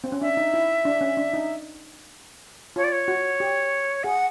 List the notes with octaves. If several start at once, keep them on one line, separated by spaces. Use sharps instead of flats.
C4
C#4
D4 E5
D#4
E4
D4
C#4
D4
D#4
F4 C#5
D5
C#5
F#4
G4
G#4 F#5